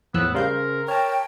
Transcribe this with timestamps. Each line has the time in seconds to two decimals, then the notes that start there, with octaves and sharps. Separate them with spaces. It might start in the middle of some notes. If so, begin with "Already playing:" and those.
0.14 E2 A2 F3 B3 E6 F#6
0.34 C#3 G3 A#4 C5 F5 C6 G6
0.88 C#5 G5 A5 F6